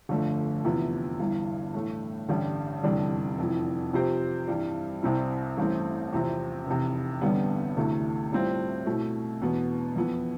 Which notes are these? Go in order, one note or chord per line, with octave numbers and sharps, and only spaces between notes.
G1 F2 D3 A3
E2 C3 F3 B3 E4
G1 G2 E3
A2 E3 A3
A1 G2 D3 G3 D4
F1 E2 D3 G3 D4
F1 F2 E3
C3 F3 C4 G4 C5
G2 E3 G3
C2 C3 G3 C4 E4
A1 G2 E3 A3 C4
E2 C3 F3 C4 E4
F1 E2 C3
A1 G2 D3 G3 B3
D2 C3 E3 A3
A2 G3 C4 F4
B2 A3 E4
E1 E2 B2 B3
F2 E3 B3 E4